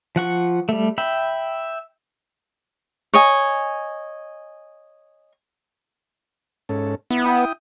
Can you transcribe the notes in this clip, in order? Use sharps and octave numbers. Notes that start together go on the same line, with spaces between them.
F3 F#5 C#6
G3 A3
E5 G5 B5
C#5 D#5 G#5
G#2 C#4 A4
B3 E4
E4 G5 D#6